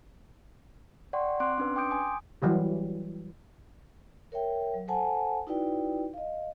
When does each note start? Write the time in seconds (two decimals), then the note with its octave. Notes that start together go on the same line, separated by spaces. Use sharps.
1.13 D5 F#5 G5 C6 C#6
1.40 C4 C6 D6 F#6 D7
1.58 C#4 D4 B4
1.76 G5 C6 D6 D#6 G6 D7
1.91 G#5 D#6
2.42 E3 F#3 G3 G4
4.32 A#4 C#5 E5 G5
4.74 F#3
4.88 A4 C5 F#5 G#5 A5
5.47 D#4 E4 F#4 B4 D5 G5
6.14 D#5 F5